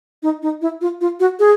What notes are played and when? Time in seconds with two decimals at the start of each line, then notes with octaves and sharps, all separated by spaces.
0.23 D#4
0.42 D#4
0.61 E4
0.81 F4
1.01 F4
1.20 F#4
1.39 G#4